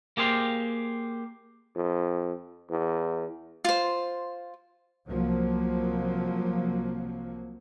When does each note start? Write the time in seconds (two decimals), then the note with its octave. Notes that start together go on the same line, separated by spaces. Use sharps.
0.17 A#3 G4 G#4 C5 F5
1.75 F2
2.70 E2
3.65 F4 C5
5.08 C2 F3 F#3 A#3